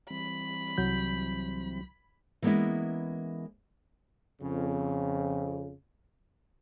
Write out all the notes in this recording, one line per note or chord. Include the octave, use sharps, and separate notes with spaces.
E3 G3 C4 B5
C2 F#3 G6
E3 G#3 A#3 B3 C#4 E4
F2 C#3